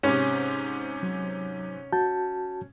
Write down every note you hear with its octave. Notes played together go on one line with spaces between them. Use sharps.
G#2 C3 C#4
F#3
F#4 A5 G6